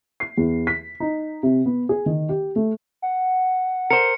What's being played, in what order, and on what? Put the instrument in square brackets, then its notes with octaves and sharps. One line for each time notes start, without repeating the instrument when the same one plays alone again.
[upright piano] C7
E2
B6
D#4
C3
B3
G#4
D#3
G4
A3
[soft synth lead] F#5
[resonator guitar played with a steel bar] A#4 C5 [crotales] C#7